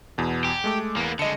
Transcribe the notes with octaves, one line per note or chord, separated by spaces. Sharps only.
E2 B2
G4
G#3 A3 D6
E2 A#3 B3
D3 G#3 D#5 C#7